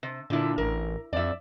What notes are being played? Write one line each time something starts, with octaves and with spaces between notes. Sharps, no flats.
C3
A#2 D3 E4
A1 A#4
F2 D5 E5